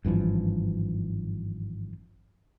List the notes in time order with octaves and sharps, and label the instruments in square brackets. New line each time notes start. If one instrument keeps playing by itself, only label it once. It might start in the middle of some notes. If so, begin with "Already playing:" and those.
[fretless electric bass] G#1 G2 E3 F3